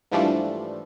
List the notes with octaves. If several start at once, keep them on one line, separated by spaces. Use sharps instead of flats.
G#2 E3 F3 G3 A3 D4